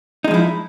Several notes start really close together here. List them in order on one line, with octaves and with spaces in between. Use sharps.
D#4 G#3 F3 E4